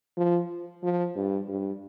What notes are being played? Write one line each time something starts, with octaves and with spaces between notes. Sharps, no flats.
F3
F3
G2
G2